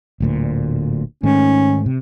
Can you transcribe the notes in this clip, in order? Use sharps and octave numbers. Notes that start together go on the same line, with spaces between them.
D1 D2 A#2
G#2 D#3 A3 C#4
C3